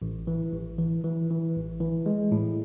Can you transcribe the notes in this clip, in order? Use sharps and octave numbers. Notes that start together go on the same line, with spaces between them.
A1
E3
A1
E3
E3
E3
A1
E3
G#3
A2